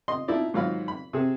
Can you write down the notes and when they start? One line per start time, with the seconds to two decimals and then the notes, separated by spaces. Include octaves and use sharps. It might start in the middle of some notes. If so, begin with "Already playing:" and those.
0.08 D#5 C6
0.28 F3 D#4 E4 D5
0.54 G#2 D#3 F#3 F4 F5 B5
0.88 B5
1.13 C3 G#4